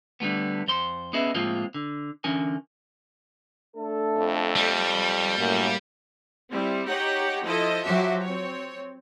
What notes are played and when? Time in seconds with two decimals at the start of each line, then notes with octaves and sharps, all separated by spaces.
0.20 D3 G3 A3 B3
0.68 F2 C5 C6
1.13 B3 C#4 G#4 B4 D#5 E5
1.35 A2 F3 G#3 A#3 C4 F4
1.74 D3
2.24 D3 E3 C#4 A#4 G#5
3.77 A3 D4 A4
4.17 F2
4.56 G3
5.38 F#2 A2 A#3
6.51 G3 C4 E4
6.88 D#4 G4 C#5 F#5
7.45 F3 E4 A4 D#5
7.85 F3 F#3 F#4 G4 E5
8.24 C4 C#5